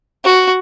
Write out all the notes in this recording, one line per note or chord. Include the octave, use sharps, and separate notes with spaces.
F#4